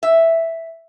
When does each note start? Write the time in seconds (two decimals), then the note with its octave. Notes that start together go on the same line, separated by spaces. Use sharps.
0.03 E5